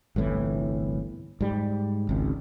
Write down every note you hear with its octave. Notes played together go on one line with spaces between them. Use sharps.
G1 C2 A2 E3
G#2 G3
G#1 C#2